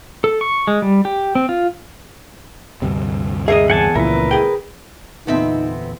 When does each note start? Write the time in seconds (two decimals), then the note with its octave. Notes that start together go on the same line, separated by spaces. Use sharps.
0.24 A4
0.41 C#6
0.67 G#3
0.82 G3
1.05 G4
1.35 C4
1.49 F4
2.82 D2 G2 C3
3.48 G#4 A#4 D#5 E5 C7
3.70 E2 G#4 F#5 G#5 A5
3.95 C#2 A#2 F3 E4 A#4 B4
4.31 G#4 G5
5.27 E2 A#2 D3 B3 C4 D#4 E5